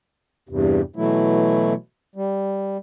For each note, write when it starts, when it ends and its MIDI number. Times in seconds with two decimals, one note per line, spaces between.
0.49 0.81 40
0.49 0.81 43
0.49 0.81 48
0.96 1.74 47
0.96 1.74 52
0.96 1.74 54
0.96 1.74 57
0.96 1.74 64
2.16 2.77 55